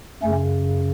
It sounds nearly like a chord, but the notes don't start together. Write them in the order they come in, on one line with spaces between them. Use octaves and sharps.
F#2 A3 C#4 C#3